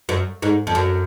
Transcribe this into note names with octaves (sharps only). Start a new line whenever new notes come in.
F#2
G#2
F2
F#2